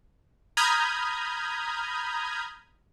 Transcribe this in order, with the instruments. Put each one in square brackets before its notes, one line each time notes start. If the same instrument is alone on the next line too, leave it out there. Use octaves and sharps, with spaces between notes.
[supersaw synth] A#5 B5 D#6 F6 G6 G#6